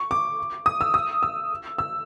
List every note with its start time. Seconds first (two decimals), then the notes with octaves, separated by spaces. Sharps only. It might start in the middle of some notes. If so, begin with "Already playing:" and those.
Already playing: C#6
0.11 D6
0.66 D#6
0.81 E6
0.94 D#6
1.23 E6
1.78 E6